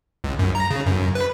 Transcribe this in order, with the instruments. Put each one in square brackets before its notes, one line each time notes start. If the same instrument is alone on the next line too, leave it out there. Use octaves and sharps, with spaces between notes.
[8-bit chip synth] C#2
F#2
A#5
C#3
F#2
B4